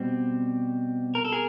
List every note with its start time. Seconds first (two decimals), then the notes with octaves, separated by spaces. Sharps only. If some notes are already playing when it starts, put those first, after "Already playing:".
Already playing: B2 G3 C4
1.15 A#4
1.25 A4
1.32 G#4 A#4